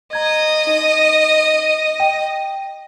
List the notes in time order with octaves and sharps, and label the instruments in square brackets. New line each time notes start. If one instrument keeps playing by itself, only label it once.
[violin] D#5 [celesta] A#5 G#6
[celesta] D#4
G5 D#7